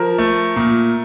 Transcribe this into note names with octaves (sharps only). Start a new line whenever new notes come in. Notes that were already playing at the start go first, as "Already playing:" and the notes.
Already playing: F3 A#4
A3
A#2